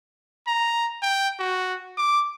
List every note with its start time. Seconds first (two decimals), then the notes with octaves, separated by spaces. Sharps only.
0.47 A#5
1.02 G5
1.39 F#4
1.97 D6